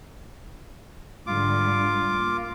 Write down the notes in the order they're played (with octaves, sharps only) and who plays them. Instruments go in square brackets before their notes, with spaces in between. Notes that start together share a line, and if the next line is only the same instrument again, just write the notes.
[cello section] G#2 D3 G3 [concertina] F4 D6
[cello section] A#3